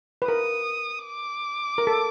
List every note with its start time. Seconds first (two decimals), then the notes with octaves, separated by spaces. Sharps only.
0.22 B4
0.28 A#4 D#6
1.07 D6
1.78 A#4
1.87 A4